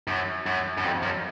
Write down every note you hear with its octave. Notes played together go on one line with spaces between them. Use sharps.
F#2
F#2
F#2
F2
F#2